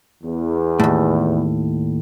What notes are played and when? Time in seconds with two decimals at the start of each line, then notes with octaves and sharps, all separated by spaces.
0.23 E2
0.80 D#2 A2